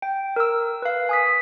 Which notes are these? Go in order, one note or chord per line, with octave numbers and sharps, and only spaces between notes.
G5
A#4 E6
B4 F5
G#5 D#6 B6